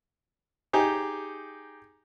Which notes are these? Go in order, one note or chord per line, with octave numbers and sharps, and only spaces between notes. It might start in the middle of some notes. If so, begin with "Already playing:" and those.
D#4 G4 G#4